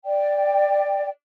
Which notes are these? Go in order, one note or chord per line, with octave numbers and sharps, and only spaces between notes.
D5 G5